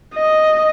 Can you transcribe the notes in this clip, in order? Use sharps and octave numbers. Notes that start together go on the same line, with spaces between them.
D#5